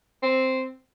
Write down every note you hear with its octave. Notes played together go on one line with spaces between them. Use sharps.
C4